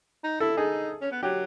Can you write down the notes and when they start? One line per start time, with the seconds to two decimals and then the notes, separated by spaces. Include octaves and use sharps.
0.24 D#4
0.40 E4 A4
0.57 D#4 G#4
1.01 C#4
1.12 B3
1.23 F#3 G4